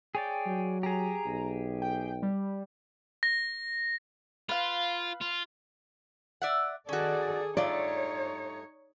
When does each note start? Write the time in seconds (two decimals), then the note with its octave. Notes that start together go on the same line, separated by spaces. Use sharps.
0.15 G#4 C#5 D5 G5
0.47 F#3
0.83 G4 G#4 A#5
1.26 B1
1.82 G5
2.23 G3
3.23 A#6
4.49 F4 B4 F5
5.21 F4
6.42 D5 E5 F#5
6.89 D#3 C#4 F#4 G#4 A4 D5
7.57 G2 A3 D#4 F4 C#5 D5